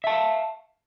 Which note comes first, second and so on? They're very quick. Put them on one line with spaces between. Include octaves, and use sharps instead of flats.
E5 A5 F5